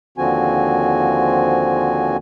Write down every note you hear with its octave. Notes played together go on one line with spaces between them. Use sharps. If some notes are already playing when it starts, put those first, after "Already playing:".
D#2 D3 F3 C4 F#4 G#5